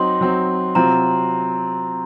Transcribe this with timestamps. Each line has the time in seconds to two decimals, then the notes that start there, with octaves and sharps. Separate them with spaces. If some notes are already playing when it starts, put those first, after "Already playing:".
Already playing: F#3 C4 D#4 C6
0.21 F#3 C4 D#4
0.75 C3 F#3 C4 F4 A#5